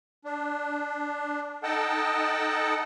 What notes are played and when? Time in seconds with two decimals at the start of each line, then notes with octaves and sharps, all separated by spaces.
0.25 D4
1.63 D#4 A4 D#5 F#5 G5 A5